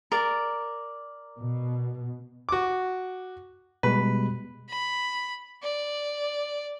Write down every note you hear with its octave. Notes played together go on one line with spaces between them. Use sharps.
A#4 D5
B2
F#4 D6
B2 G3 G#3 B4
B5
D5